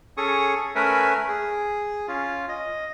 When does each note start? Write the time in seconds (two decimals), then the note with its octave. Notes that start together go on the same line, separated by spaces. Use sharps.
0.17 C#4 G#4 A4 C#6 D#6
0.75 A3 C#4 A#4 B4 E5 G#5
1.28 G#4
2.08 C#4 F4
2.49 D#5